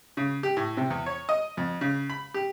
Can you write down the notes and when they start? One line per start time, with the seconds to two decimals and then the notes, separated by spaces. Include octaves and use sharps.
0.17 C#3
0.43 G4
0.57 A2
0.77 C3
0.90 E2
1.06 C#5
1.29 D#5
1.57 F2
1.81 C#3
2.09 B5
2.34 G4